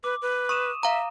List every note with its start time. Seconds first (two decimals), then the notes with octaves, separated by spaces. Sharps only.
0.04 B4 D6
0.22 B4
0.49 C#6 D#6 D#7 E7
0.83 E5 F5 A#5